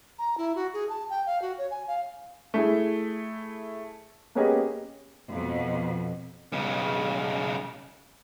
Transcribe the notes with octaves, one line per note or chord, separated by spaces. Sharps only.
A#5
E4
F#4
G#4
A5
G5
F5
F#4
C#5
G#5
F5
A3 E4 G#4
A#3 B3 C#4 G4 G#4 D#5
F2 B2
B1 C#3